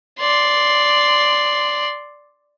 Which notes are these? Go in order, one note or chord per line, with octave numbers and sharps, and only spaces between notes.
D5 C6